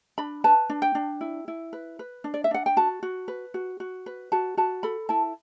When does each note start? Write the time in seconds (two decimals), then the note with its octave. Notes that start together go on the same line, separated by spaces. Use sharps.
0.18 D4 B5
0.44 B4 A5
0.70 D4
0.82 G5
0.95 D4
1.21 E4
1.48 E4
1.73 B4
1.99 B4
2.24 D4
2.34 D5
2.44 E5
2.51 D4 F#5
2.66 G5
2.77 F#4 A5
3.03 F#4
3.28 B4
3.54 F#4
3.80 F#4
4.06 B4
4.32 F#4 A5
4.57 F#4 A5
4.83 A4 B5
5.09 E4 A5